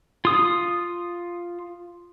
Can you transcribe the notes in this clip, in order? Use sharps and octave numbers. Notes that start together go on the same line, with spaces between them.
F4 D#6